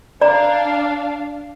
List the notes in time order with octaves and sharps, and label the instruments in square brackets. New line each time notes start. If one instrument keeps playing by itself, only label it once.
[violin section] D4 F5 [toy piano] D5 A#5